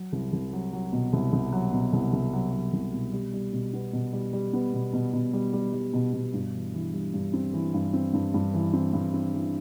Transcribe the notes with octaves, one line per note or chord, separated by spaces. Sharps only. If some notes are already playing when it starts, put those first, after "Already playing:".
Already playing: F#3
C2
C2
F#3
F#3
B2
C2
C2
F#3
B2
C2
C2
F#3
F#3
C2
B2
G3
G3
B2
B3
B2
G3
G3
B3
B2
B2
B2
G3
G3
G3
B2
B2
G2
E3
E3
G3
G2
C4
E3
G2
C4
G2
G2
E3
C4
G2
C4
E3